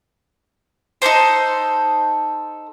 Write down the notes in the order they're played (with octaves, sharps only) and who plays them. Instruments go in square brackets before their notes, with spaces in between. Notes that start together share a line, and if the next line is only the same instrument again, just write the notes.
[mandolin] D#4 G#4 A4 C5